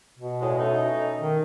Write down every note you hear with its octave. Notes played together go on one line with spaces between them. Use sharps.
B2
E2 A2 G#3
A3 C#4 D#4
D#3